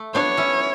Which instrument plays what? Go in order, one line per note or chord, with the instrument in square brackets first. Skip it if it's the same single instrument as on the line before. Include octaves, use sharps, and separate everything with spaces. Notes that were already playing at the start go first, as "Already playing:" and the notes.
Already playing: [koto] A3
[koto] B3 D4 [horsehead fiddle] C#5
[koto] C#4 E4